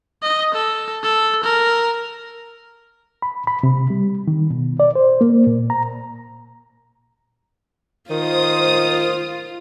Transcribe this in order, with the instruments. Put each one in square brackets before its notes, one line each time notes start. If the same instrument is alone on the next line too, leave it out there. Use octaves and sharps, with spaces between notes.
[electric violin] D#5
A4
A4
A#4
[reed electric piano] B5
B5
C3
G3
D#3
B2
D5
C5
A#3
A#2
A#5
[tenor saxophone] D#3 [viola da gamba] F4 [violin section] C5 D#6